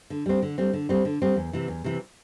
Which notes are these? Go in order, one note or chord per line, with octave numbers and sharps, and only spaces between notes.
D3
G3 C4
D3
G3 C4
D3
G3 C4
D3
G3 C4
E2
C3 E3
E2
C3 E3